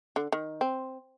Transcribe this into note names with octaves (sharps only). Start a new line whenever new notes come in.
D3
D#3
C4